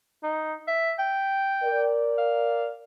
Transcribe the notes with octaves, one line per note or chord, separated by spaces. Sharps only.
D#4
E5
G5
A#4 D5
F5